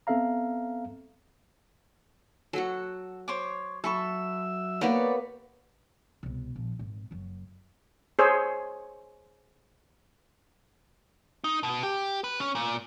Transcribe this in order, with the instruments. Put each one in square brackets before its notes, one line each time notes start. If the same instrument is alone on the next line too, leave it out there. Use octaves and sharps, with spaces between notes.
[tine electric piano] B3 C4 A4 E5 F5 A#5
[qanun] F#3 F#4 [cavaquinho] A4 F#5
[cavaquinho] C5 C#5 D6
[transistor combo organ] F#3 E5 E6 [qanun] A4 [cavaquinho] A5 B5 C#6
[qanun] A#3 B3 G4 [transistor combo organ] C#5 B5 [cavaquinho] D5 F#5 A#5
[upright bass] C2 B2
A#1
G#1
F#1 F#2
[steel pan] G#4 C5 C#5 E6
[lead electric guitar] D#4
B2
G4
B4
C#4
A#2